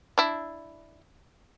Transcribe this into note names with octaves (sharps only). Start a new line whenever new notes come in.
D4 E4